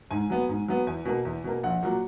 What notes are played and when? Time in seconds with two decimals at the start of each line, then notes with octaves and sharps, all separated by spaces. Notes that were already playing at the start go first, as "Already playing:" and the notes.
0.11 G#2 G#5
0.30 F#3 B3
0.49 G#2
0.68 F#3 B3
0.87 E2 G#5
1.05 B2 A#3
1.25 E2
1.44 B2 A#3
1.63 A#1 F#5
1.82 A#2 F#3